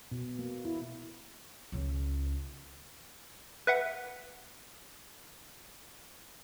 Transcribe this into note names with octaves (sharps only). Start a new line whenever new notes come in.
B2
A#3
E4
C#2 C#3
B4 E5 F#5